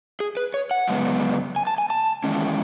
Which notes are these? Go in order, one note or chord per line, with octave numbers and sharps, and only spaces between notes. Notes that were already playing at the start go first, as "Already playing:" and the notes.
G#4
B4
C#5
F#5
F#2 C#3 G#3 B3
G#5
A5
G#5
A5
E2 D#3 G#3 C#4